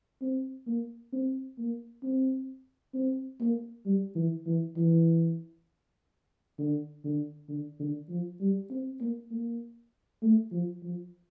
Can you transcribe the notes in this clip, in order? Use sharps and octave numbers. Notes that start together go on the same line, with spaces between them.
C4
A#3
C4
A#3
C4
C4
A#3
G3
E3
E3
E3
D3
D3
D3
D3
F3
G3
C4
A#3
A#3
A3
F3
F3